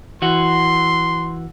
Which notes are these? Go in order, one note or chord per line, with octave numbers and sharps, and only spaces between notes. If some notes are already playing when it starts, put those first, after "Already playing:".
E3 F#4 C6